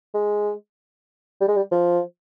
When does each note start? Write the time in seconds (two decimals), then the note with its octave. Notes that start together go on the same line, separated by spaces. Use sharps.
0.14 G#3
1.41 G3
1.48 G#3
1.56 G3
1.71 F3